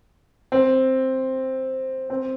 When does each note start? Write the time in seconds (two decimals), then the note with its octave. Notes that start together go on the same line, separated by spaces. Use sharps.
0.52 C4
2.10 C4